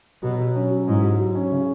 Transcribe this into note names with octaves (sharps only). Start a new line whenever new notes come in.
B2 F#3
F#3
C#4
F#3
G#2 E4
F#3
F#3
C#4
C#3